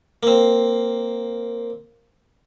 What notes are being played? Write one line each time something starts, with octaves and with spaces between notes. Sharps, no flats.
A#3 C4